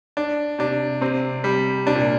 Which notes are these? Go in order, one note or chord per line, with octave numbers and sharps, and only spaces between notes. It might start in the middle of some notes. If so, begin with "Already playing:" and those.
D4
C3 D4
C3 C4
G3
C3 D4
A#2